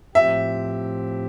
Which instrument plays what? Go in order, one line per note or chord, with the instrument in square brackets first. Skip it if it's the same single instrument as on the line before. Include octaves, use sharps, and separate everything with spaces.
[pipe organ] A2 F3 C4 G4 [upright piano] E5